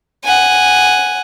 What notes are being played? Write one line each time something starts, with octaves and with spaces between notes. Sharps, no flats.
F#5 G#5